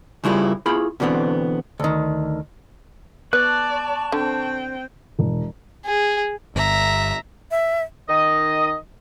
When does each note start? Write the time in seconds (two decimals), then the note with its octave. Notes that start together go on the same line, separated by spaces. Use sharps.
0.24 C#3 G3 E4 F4 G#4
0.66 E4 F4 G#4 B5
1.00 B2 D3 E3 B3 C4
1.80 D2 D#3
3.33 B3 D5 A5 C#6 F#6
4.12 D3 C4 G5
5.19 E1
5.85 G#4
6.56 G1 E5 A#5
7.51 E5
8.09 D#3 D#5